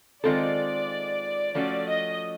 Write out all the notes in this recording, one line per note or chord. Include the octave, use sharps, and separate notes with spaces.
D#3 G#3 C4 F4 A4 D5
F3 A3 C#4 F#4 D5
D#5